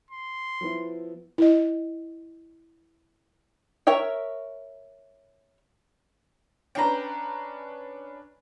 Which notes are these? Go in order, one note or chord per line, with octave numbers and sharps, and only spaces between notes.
C6
F3 B3 E4
E4 D#5
A#4 C#5 E5 G5
C#4 D4 B4 G5 A#5